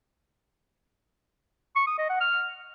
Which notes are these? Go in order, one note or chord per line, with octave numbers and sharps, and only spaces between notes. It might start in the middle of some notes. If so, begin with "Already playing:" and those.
C#6
D#6
D#5
F#5
F6